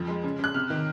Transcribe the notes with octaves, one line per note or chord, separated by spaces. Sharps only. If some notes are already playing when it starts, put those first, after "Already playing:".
Already playing: F2 F3
G#3
C#3
C#3 F#6
C3 F6
D#3